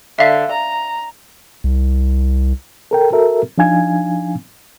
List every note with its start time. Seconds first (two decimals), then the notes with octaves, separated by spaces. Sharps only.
0.19 D3 E5 F5 B6
0.51 A#5
1.64 C2
2.91 A4 A#4 G5
3.12 F#4 A4 A#4 E5
3.58 F3 D4 D#4 F5 G#5 G#6